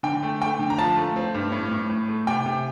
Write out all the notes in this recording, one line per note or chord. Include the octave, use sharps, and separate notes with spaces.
D3 G5
A3
A3 G5
D3
A#5
F3 A5
A3
C4
G2
A2
A2
A2
A3
C3 G5
C3